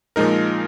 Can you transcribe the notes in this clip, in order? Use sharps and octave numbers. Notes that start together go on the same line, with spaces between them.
A#2 F3 G#3 D#4 A#4